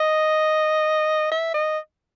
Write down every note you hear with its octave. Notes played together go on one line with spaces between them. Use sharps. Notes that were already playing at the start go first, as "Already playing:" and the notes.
Already playing: D#5
E5
D#5